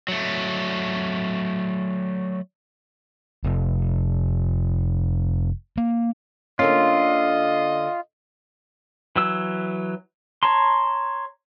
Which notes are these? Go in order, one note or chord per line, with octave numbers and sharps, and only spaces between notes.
F#3 A3
F1
A#3
D3 A#3 C#4 F4 D#5
E3 F#3 E6
C#5 A5 A#5 C6